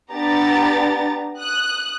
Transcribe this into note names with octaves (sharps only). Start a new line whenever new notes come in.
B3 D4 G4 A#5 A6
D#6 F#6